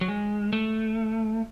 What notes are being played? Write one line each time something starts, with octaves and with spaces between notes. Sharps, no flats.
F#3
G#3
A3